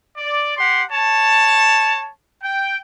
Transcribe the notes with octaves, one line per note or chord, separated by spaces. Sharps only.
D5
G4 F#5 C6
C#5 A5
G5